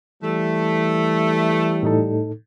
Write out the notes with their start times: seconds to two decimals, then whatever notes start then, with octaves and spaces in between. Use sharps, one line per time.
0.23 E3 G3 A3
1.83 A2 D#4 A4